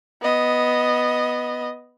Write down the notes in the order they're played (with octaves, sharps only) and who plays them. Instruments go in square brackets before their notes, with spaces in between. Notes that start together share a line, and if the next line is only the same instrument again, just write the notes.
[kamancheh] B3 D#5